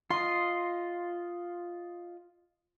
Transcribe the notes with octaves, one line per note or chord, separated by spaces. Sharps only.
F4 D#5 C6